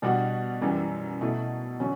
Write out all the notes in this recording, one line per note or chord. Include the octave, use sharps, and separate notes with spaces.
B2 G3 D4 F#4
F#2 E3 G3
B2 A3 E4
D3 F#3 C#4